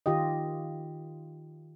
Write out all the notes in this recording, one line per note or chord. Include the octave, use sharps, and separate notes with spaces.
D#3 F4 G4 D#5